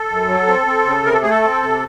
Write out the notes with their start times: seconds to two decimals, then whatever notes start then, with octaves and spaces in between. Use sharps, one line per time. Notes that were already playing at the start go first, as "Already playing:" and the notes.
Already playing: A4
0.09 F#2
0.28 F#3
0.47 C4
0.67 C4
0.86 C#3
1.04 C3 A#4
1.13 A4
1.22 A3 G#4
1.30 A4
1.43 C4
1.63 C3